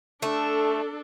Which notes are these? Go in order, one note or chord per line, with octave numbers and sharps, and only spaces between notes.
A3 D4 A4